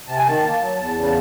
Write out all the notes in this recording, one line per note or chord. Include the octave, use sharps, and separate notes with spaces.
C3 A5
G#5
D#3 A5
A#3
F#3
E2
C#3
A5